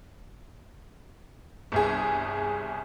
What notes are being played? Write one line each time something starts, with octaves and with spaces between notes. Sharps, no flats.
G1 C2 G#4